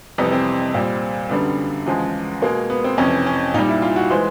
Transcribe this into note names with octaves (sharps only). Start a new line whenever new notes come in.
F2 C3 E3 G3 B3
C4
A#2 G3 C4
F#2 D3 G3 B3
E2 C#3 F3 G#3
B2 G#3 A#3
B3
C4
F2 C3 E3 C#4
C#4
A#2 G3 D#4
E4
F4
F#4
E3 G#3 C5